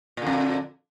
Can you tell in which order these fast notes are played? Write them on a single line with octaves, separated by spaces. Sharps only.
A#2 D3 F2